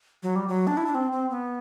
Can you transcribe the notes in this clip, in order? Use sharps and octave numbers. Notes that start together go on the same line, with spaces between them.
F#3
G3
F#3
D4
E4
D4
C4
C4
B3